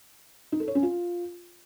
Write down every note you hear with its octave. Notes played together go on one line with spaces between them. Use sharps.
D#4
A4
C#5
C#4
F4